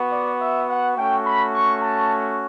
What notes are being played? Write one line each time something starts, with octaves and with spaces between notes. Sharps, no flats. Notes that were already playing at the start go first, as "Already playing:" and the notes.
Already playing: B3 F#4
D5
E5
F#5
A3 C#4 F#4 G5
B5
C#6
A5